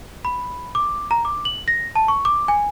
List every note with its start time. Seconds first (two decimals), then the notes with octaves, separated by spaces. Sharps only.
0.25 B5
0.75 D6
1.11 A#5
1.25 D6
1.45 F#7
1.68 A#6
1.96 A5
2.08 C#6
2.25 D6
2.48 G#5